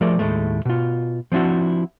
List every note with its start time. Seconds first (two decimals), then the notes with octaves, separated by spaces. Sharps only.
0.01 F3 A3 G#4 A#4 D5
0.19 D#2 A2 G#3 A3
0.65 B2 F4
1.32 F3 C4 D4 E4 F#4